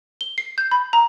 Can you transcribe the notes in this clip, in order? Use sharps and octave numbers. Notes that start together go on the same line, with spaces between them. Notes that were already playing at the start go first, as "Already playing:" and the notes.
G7
C7
G6
B5
A#5